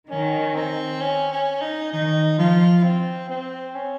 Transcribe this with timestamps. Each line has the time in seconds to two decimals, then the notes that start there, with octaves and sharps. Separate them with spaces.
0.10 D#3 C#4
0.55 C4
1.01 C#4
1.32 C#4
1.61 D#4
1.92 D#3 D#4
2.38 F3 F4
2.84 C4
3.29 C4
3.75 C#4